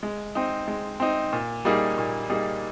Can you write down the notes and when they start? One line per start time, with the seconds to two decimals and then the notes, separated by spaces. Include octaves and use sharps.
0.03 G#3
0.35 C4 D#4
0.68 G#3
1.00 C4 D#4
1.32 A#2
1.65 G3 A#3 D#4 G#4
1.98 A#2
2.30 G3 A#3 D#4 G#4